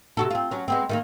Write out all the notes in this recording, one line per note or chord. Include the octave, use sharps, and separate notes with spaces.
C3 F#4 A4
C4 F4
F#3 C#4
G#3 B3 C4
D#3 A3 A#3